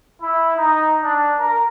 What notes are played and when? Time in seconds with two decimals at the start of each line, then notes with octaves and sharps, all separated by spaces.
0.21 E4
0.57 D#4
1.01 D4
1.39 A#4